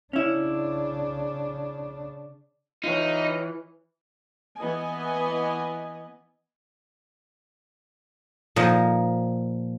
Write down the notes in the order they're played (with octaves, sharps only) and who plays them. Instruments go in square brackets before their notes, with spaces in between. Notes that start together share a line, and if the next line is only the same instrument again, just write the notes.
[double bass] C#3 D4 [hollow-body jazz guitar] C#4 E4
[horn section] E3 [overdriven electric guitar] D#4 [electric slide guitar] F4 C#5
[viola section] E3 B3 B4 D#5 G#5
[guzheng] A#2 F3 D#4